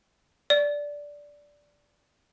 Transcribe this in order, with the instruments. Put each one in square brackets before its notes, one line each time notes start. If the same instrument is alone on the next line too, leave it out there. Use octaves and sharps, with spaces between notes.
[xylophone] D5